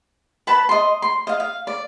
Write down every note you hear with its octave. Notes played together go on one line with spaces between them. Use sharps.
B4 A5 B5
D#5 C6
C6
D#5 F5
F5
D5